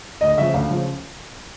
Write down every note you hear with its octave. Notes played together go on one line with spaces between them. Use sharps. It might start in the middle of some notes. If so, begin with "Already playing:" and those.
D2 D#5
C#3 F3 E5
D2 F5
C#3 F3